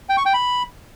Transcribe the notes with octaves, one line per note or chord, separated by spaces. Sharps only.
G5
C#6
G5
B5